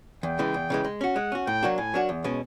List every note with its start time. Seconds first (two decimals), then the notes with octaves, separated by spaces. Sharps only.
0.23 E2 G5
0.39 C#3 E3 G#3
0.54 E2
0.70 C#3 E3 G#3
0.85 G#3
1.01 C#4 F#4
1.15 G#3 F#5
1.32 C#4 F#4
1.47 A2 G5
1.63 F#3 A#3 D4 F#4
1.78 A2 G#5
1.94 F#3 A#3 D4 F#4
2.09 E2
2.24 B2 G#3 C#4